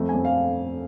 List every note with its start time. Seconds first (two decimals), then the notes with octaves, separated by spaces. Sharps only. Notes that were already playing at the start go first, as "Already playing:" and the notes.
Already playing: F2 A3
0.09 G#5
0.14 F2
0.25 F5